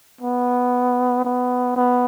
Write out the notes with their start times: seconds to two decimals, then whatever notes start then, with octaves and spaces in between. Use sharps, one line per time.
0.21 B3
1.25 B3
1.76 B3